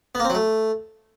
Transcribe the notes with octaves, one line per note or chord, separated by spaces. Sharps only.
B3
A#3
C4
F#3
A3